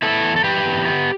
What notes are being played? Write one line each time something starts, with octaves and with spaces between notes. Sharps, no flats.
B3 E4 A4
E2
A4
E3 G4 B4
E2
B3